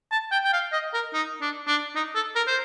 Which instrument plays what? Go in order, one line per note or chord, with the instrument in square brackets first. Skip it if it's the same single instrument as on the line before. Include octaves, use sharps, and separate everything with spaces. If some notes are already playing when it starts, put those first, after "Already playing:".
[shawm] A5
G5
G5
F5
D#5
A#4
D#4
D4
D4
D#4
A4
A#4
C5